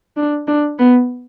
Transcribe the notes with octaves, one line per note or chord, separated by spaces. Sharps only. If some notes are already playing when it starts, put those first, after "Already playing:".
D4
D4
B3